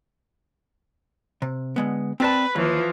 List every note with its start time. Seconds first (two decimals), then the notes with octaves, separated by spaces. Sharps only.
1.42 C3
1.76 D3 G#3 B3
2.20 C4 B4 D5 A5
2.56 D#2 E3 F3